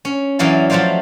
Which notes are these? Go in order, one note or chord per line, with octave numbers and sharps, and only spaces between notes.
C#4
F#2 E3 C#4 D5 F5
F3 F#3 A3 C5 D5 F5